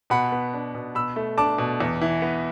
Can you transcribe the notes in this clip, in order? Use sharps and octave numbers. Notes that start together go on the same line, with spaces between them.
B2 F#5 B5
B3
D4
B2
B2 B5 E6
A3
D4 A5 D6
B2
E2
E3
B3